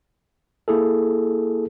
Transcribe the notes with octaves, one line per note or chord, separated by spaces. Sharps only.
A#3 E4 G#4 A4